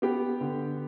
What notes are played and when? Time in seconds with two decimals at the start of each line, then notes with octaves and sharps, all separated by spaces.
0.02 B3 G4 G5
0.41 D3